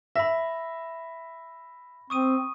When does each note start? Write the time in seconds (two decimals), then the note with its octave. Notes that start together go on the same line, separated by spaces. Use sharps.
0.16 E5 B5 A#6
2.10 C4 C#6 D#6 D#7